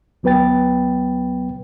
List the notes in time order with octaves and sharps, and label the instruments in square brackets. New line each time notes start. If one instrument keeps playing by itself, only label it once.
[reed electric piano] D2 F#3 B3 B4 G5 A6